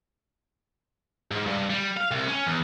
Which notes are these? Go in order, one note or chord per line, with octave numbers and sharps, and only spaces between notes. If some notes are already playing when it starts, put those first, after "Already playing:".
G#2
G2
G3
F5
C2
C#4
E2